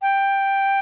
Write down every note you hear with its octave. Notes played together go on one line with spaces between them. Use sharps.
G5